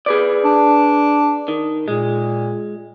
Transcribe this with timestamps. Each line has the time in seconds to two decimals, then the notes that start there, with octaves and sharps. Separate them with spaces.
0.06 G#4 B4 D5
0.45 D4
1.48 D#3
1.88 A#2 G#3